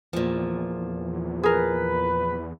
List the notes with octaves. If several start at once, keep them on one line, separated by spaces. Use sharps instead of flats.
E2 A#2 F3
G#4 A#4 B4